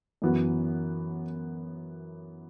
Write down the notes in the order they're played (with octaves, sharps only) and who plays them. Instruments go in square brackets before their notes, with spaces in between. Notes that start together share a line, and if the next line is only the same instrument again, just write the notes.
[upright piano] F#2 E3 B3 F#4